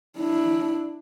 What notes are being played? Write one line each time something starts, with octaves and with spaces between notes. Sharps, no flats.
D4 E4